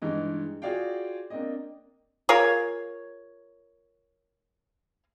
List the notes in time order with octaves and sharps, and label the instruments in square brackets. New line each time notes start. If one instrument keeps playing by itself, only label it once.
[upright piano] G2 E3 G#3 D#4
F4 F#4 G#4 D5 F5 G5
A#3 C4 D4 D5 D#5
[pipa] F4 G#4 A#4 C#5